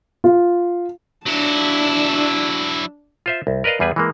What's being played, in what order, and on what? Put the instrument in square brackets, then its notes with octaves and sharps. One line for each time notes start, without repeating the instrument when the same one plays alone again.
[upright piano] F4
[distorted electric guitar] F#3 E4 [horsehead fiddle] D4 A5
[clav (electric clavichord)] F4 C5 E5
C2
A#4 B4 D5 D#5 F5
E2 G3 G#4 B4 G#5
E3 G#3 A#3